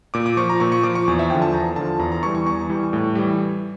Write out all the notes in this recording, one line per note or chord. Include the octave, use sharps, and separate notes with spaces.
A#2 D6
D6
F3 C#6
A#5
A#2 C#6
C#6
F3 D6
C#6
E2
E5
D3 F3 G5
A5
E2 A#5
D3 F3 A5
E2 A#5
A#5
E3 G3 C#6
C#6
E2 C#6
E3 G3
A2
E3 G3